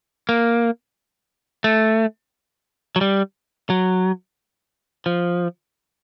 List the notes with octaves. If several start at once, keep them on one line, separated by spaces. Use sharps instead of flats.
A#3
A3
F#3
G3
F#3
F3